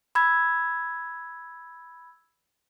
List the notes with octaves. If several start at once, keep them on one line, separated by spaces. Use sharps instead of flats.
B5 E6 G#6